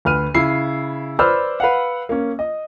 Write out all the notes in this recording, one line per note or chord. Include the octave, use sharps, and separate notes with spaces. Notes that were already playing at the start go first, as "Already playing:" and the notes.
D2 B4 F6 D#7
C#3 E4 C7
B4 C5 D5 B5 E6 F6
B4 F5 F#5
A#3 C#4
D#5